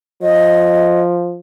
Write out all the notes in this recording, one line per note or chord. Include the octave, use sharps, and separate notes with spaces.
F3 D#5